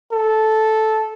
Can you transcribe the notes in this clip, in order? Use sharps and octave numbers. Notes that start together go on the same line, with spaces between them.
A4